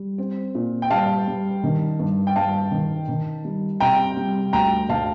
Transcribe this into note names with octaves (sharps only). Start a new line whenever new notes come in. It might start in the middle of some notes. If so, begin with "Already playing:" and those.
Already playing: G3
C4
A#2
G5
G3 F5 A5
G3
D#3
G2
G5
G2 F5 A5
D#3
D#3
G3
C3 G5 A#5
G3
D2 G5 A#5
D2 F5 A5